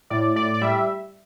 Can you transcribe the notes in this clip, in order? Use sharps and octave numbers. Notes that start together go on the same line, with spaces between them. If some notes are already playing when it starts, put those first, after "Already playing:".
A2 D5
A2 D5
D5
G3 E5